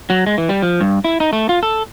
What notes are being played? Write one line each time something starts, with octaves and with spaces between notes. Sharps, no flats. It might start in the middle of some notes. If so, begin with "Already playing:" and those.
F#3
G#3
E3
G3
F3
G2
E4
D#4
A3
F4
A4